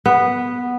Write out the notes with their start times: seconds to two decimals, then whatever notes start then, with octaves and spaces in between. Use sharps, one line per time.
0.06 B3